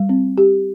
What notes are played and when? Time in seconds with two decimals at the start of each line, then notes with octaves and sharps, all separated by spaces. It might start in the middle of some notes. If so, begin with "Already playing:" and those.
Already playing: G3
0.09 C4
0.38 G4